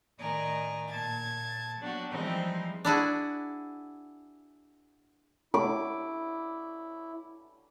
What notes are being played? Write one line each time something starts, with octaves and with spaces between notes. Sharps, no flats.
A2 D#3 D5 D#5 G#5 A#5
A#2 A5 G#6 A6
F#3 B3 D4 F#4 G4
E3 F3 G3 G#3 C4 D#4
D4 E4 F#4 G#4
E4 D6